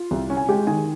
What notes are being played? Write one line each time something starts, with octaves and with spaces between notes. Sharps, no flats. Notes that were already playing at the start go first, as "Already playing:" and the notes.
Already playing: F4
C2
C#4
G#5
G#3 G4 G5
D#3 G#4 G#5